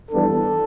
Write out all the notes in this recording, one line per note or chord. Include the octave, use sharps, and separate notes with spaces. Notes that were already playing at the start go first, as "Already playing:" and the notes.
G2 E3 B3 D4 A4